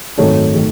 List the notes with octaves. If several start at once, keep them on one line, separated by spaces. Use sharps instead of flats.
G#1 F#2 D#3 A3 A4 C#5
D#3 A3